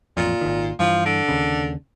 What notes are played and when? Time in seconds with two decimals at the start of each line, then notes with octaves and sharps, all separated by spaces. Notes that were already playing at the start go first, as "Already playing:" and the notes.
0.17 A1 F2 A#2
0.41 G#1 D#3
0.79 G2 E3 F3
1.05 D3
1.28 D#2 C#3